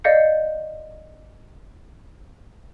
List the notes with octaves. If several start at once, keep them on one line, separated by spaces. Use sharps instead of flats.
D5 D#5 F5 G6 C#7